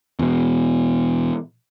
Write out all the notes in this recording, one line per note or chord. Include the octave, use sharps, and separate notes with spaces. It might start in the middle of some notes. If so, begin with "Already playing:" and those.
E2 B2